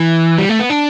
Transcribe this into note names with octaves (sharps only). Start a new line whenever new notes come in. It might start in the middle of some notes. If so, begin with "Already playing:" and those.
Already playing: E3
G3
A3
B3
D4